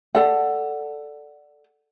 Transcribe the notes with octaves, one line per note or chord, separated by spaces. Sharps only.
A4 D5 F#5